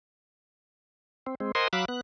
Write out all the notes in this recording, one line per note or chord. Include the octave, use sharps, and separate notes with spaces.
C4
G#3 C4
A#4 C5 D#5 F#5 G#5 C6
F#3 F5 B5 D6 E6 F#6
B3 F#6